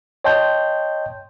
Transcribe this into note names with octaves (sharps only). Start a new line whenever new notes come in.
C#5 D#5 G5 A5 C6 G6